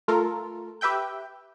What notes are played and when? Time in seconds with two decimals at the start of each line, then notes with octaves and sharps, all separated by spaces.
0.08 A3 F4 A4 A#4
0.81 G4 B4 E5 G5 G6